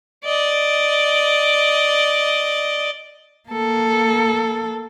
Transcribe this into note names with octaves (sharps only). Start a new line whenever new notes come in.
D5 D#5
A#3 A4